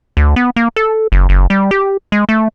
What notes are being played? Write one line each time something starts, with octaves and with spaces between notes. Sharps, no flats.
D2
B3
A#3
A4
F#1
F#1
G3
G4
G#3
A3